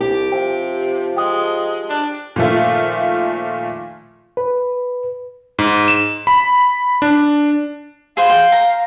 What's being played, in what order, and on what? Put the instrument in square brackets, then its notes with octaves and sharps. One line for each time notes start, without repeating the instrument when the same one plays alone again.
[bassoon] C2 [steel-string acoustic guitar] G4
[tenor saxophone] C3 [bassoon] F3 [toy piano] G5
[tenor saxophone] G#3 [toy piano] G5 D#6
[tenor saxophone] D4
[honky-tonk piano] A#2 D#3 F3 A3 F4
[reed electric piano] B4
[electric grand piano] G#2
E7
B5
D4
[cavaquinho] G#4 B4 C5 [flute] F5
[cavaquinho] G5
A#5